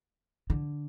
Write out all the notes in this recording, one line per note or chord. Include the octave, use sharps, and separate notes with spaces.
D3